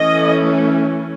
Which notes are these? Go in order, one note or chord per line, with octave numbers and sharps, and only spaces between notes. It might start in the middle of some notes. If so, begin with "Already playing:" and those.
Already playing: E3 A3 C#4 D#5